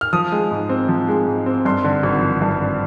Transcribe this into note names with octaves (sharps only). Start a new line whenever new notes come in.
F6
F3 D#6
G#3
G#2
C4
F3
G#3
G#2
C4
G2 C6
D3
G#1
F3
G2
D3